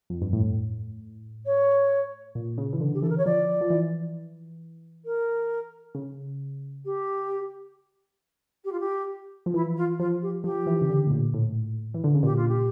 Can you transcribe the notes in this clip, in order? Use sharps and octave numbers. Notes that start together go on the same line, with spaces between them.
F2
G2
A2
C#5
A#2
C#3
E3
D3
G4
E3 A4
A#4
C#5
F3 D5
F3
E3
A#4
C#3
G4
G4
F4
G4
F3
E3 E4
F4
F3 F4
G4
F3 G4
E3
C#3
D3
A2
A#2
A2
E3
D3
C#3
A#2 G4
F4
G4